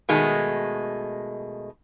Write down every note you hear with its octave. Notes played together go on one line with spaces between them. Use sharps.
B2 D#3 G#3 A3